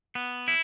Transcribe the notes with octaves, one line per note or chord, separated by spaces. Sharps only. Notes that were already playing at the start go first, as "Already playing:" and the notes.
B3
E4